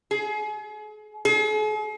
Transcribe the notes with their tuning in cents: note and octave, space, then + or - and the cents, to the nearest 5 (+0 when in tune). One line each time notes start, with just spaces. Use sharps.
G#4 +40
G#4 +45